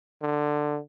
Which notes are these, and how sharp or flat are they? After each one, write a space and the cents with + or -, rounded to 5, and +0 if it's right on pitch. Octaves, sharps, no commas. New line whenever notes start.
D3 +10